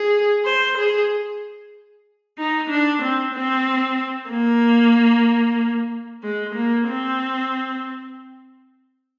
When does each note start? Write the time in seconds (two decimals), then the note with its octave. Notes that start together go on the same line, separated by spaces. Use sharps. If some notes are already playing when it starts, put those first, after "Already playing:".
Already playing: G#4
0.45 C5
0.78 G#4
2.38 D#4
2.70 D4
3.02 C4
3.34 C4
4.30 A#3
6.23 G#3
6.55 A#3
6.88 C4